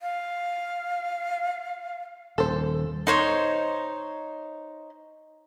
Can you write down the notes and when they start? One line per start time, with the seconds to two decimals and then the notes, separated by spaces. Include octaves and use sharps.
0.01 F5
2.38 D#1 A4 C5
3.07 D#4 C5 C#5